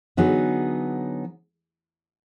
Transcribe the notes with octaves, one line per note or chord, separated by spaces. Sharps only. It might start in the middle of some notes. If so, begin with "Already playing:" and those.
D3 F#3 B3 D#4 G#4